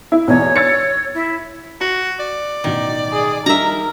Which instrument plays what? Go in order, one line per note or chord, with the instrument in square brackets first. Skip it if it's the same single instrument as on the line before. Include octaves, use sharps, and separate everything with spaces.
[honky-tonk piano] E4
[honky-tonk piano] B1 E2 [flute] C#5
[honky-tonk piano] E6 A6 C#7
[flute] E4
[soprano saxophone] F#4 [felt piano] C#6
[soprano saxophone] D5
[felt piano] A1 B2 [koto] D#3
[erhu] G#4
[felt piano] G3 D#4 [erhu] A#4 [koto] E5 A#5